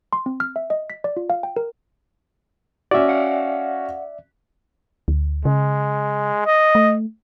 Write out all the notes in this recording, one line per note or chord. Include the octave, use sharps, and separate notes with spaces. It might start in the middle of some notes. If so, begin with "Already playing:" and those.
C6
C4
F6
E5
D#5
B6
D5
F4
F5
G5
A#4
C#4 F#4 D5 E5
F5 F#5
D2
C#3 G#3
D#5
A3